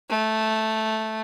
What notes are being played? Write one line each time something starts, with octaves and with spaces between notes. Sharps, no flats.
A3